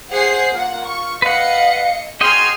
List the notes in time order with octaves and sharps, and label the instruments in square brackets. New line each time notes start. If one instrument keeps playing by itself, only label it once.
[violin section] G#4 F#5 C7 [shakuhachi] C5
[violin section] A#3 F#5 [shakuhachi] F4
[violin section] C#6
[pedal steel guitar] B4 F#5 [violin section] D#5 C#7 [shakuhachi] F5
[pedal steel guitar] F#4 D#5 G5 [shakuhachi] G#4 [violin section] C6 F6 G#6